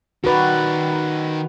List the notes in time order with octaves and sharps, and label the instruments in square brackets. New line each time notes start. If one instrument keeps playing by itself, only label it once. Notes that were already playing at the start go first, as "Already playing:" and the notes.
[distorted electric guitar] D#3 D5 [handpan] F#4 B4